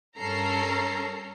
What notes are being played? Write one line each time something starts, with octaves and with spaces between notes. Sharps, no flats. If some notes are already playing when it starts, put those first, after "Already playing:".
G2 C#4 A4 A#4 A#5 C7